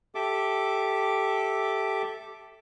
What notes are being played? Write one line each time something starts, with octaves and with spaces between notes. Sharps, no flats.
G4 A4 E5 D6